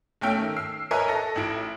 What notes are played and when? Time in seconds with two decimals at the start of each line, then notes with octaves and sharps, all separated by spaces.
0.21 B1 A3 C#4 G5 E6 D7
0.38 D#3
0.56 E6 C7
0.91 A#4 B4 C#5 D#5 E5 G#5
1.08 A4 A#6
1.36 A1 E4 D7